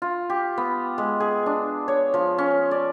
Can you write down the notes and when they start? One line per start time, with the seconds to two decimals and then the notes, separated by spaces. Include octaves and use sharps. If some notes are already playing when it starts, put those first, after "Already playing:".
0.02 F4
0.30 G4
0.57 B3
0.98 G#3
1.20 G#4
1.46 D4
1.88 C#5
2.14 F3
2.38 C#4
2.71 D5